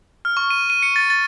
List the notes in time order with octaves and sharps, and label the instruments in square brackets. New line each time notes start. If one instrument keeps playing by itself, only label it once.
[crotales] F6
C#6
D#7
D#7
C#7
A6
A6